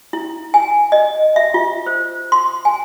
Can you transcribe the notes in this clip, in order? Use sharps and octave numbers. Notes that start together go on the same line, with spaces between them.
E4
G#5
D#5
E5
F4
C5
C6
G#5